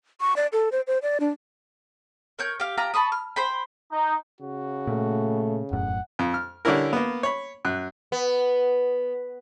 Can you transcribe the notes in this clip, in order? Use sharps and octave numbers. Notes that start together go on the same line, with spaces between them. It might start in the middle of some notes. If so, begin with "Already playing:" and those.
C#6
D5
A4
C5
C5
D5
D4
A#4 C#5 G6
G4 F5
F4 G4 A#5
A5 B5 C#6 D#6
F6
C5 G5 B5
D#4
C#3 F#4
A#2 A3
E1 F#2 A2 F#5
F2
F6
D3 G3 C#4 E4 A#4
A#3 B3
C#5 B5
F#2 F#6
B3